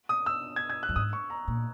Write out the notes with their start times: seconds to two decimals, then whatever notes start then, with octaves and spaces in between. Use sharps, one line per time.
0.09 D#6
0.26 E6
0.56 G#6
0.70 G#6
0.83 F#6
0.89 F#2
0.96 G#2 D#6
1.13 C#6
1.30 A#5
1.48 A#2